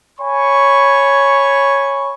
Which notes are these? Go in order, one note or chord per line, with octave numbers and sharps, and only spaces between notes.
C#5 G#5 B5 C#6